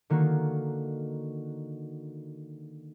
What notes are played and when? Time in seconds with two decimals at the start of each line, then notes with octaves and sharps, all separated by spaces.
0.10 D3 D#3 A#3 F#4